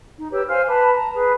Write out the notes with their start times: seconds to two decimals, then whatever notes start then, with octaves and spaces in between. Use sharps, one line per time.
0.17 D#4
0.31 G4 B4 C#5 E6
0.48 C5 F5 G#5 F6
0.67 B4 A5 B5 D6
0.94 A5 A#5
1.13 G#4 B4